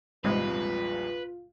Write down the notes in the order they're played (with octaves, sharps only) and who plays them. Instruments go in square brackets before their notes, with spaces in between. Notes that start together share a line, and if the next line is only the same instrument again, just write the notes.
[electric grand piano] A#1 E2 G3 [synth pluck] G#2 C3 G#3 [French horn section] F4 [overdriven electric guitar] B4